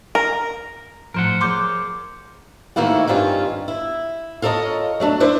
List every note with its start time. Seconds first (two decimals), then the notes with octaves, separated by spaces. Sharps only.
0.15 A#4
1.14 A2 F3 A#4 C5 F#5
1.41 F3 G#4 C#5 C6 D6 G6
2.76 G#2 D#3 A3 A#3 E4 F#4
3.07 G2 D#3 C4 C#4 F4
3.68 E4
4.42 F4 A4 A#4 C#5 D#5
5.00 F#3 A3 D4
5.20 D4 E4 B4 C5 E5